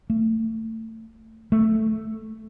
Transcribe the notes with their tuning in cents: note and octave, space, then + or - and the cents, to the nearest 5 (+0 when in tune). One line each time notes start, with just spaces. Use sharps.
A3 +25
A3 +0